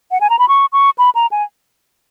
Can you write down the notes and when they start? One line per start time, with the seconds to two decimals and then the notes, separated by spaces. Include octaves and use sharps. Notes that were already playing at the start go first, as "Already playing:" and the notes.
0.11 F#5
0.21 G#5
0.30 A#5
0.39 B5
0.48 C#6
0.73 C#6
0.98 B5
1.15 A#5
1.32 G#5